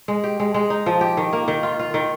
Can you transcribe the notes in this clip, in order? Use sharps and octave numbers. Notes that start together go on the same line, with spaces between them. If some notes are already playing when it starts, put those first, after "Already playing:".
G#3
G4
G#3
G#3
D#4
F3
G4
D#3
A#3
D#3
F4
F4
D#3